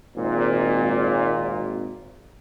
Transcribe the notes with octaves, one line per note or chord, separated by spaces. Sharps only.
G#1 A#2